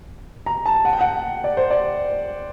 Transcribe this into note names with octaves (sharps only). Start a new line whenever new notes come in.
A#5
A5
F#5
G5
F#5
D5
C5
D5